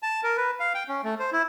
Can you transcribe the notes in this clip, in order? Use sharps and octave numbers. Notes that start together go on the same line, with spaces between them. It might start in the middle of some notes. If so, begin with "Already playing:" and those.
A5
A#4
B4
F5
G5
C#4
A3
C5
E4